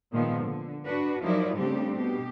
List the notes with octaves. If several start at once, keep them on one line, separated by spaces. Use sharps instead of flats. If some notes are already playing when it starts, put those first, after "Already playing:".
A#2 D#3 F3 G#3 B3
D3
D4 F#4 B4
F3 F#3 D#4 E4 A#4 D5
C#3 G3 A3 C4 D4 G4
B2 G4